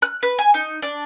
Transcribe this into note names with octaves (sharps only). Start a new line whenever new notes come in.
F#6
B4
G#5
D#4
D4